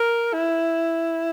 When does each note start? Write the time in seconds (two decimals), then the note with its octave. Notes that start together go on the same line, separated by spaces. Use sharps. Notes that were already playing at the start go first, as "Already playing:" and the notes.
Already playing: A#4
0.33 E4